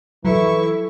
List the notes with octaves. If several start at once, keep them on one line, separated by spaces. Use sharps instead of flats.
E3 F#3 E4 A4 C#6